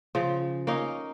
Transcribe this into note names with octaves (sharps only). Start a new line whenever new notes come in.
C#3 F3
A#3 C#4 D#4